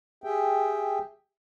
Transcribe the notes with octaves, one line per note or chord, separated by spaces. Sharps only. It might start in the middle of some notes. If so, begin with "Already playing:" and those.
G4 G#4 E5 G5